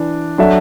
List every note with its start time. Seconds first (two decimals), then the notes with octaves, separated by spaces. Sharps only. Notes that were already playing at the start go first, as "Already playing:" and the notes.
Already playing: E3 D4
0.38 F#3 D4 A4 E5